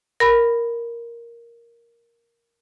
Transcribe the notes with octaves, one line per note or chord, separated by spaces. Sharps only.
A#4 B5